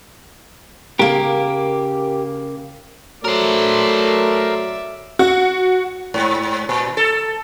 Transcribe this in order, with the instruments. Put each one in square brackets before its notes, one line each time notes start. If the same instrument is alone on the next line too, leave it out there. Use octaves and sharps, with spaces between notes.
[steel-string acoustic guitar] C#3 A#3 [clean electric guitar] G4 A#4
[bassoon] F#3 [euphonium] A3 [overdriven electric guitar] A#4 C5 [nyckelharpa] D5 E5
[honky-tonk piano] F#4
[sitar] G#2
A#2
A4